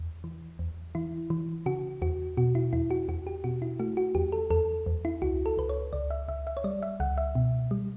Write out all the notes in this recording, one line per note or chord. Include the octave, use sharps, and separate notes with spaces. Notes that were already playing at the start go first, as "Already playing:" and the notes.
Already playing: E2
E3
E2
E3 E4
E3
C#3 F#4
E2 F#4
B2 F#4
E4
E2 E4
F#4
E2 F#4
G4
B2 F#4
E4
A3 F#4
F#4
E2 G4
A4
E2 A4
E2
E4
C#2 F#4
A4
C#2 B4
C#5
C#2 D5
E5
C#2 E5
E5
C#5
G3 D5
E5
C#2 F#5
E5
B2
G3